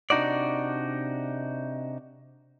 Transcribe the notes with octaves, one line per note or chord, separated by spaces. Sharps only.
C3 D4 D#4 F#4 D5